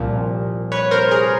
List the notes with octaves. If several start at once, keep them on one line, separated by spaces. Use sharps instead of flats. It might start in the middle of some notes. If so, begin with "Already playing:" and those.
Already playing: C2 A#2 F3
B4 C#5
A#4 C5
G#4 A#4